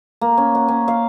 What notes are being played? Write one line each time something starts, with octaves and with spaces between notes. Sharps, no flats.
A#3
C#4
F#5
C#4
F5